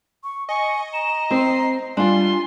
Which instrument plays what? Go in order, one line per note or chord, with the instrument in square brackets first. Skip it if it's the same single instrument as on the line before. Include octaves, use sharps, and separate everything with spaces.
[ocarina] C#6
[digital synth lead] D#5 [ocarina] G#5 [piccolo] C#6
[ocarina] A#5 [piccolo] E7
[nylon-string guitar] C4 C5 [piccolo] C7
[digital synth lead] G3 [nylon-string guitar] D4 F4 [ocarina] G#5 [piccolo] C6